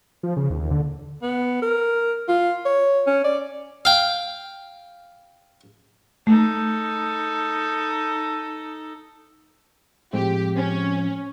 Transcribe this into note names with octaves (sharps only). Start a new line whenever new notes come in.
F3
C#3
D#2
D3
B3
A#4
F4
C#5
C#4
D5
F5 G5
A3 D#4 A4
A2 F3 G#3 C4 G4
C#4